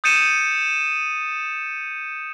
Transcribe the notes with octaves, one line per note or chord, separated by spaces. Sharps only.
D#6 G6 A6 C#7 D#7 E7